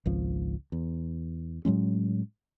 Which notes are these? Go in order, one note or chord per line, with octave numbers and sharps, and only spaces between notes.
G#1 C#2 F3
E2
A2 F#3 G#3 C#4